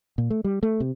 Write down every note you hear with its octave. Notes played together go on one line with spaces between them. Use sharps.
A#2
A3
G3
A3
C3